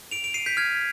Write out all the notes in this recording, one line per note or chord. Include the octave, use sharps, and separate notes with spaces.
D7 F7
D7 F7
C7 D#7
G6 B6
F6 G#6